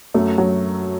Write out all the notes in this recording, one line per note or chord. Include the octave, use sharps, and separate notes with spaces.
F#2 A3
F#3